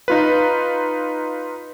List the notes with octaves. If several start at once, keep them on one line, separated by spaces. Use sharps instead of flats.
D#4 F4 B4